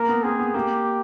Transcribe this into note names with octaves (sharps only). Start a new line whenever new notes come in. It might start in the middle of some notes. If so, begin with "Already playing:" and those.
Already playing: A#3 A#4
B3
C4 G#4
B3
A#3 G4